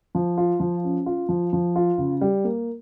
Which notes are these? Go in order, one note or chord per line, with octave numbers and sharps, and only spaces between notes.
F3
F4
F3
C#4
F4
F3
F3
F4
C#3
G3
A#3